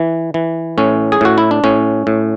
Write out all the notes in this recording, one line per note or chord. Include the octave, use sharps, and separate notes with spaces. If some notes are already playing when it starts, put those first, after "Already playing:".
Already playing: E3
E3
A2 C#4
G#4
A2 F#4
E4
D4
A2 C#4
A2